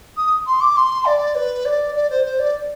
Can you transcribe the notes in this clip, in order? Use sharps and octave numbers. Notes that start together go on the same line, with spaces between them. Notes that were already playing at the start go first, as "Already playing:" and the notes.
D#6
C6
D6
C6
D5
B4
D5
D5
C5
C5
D5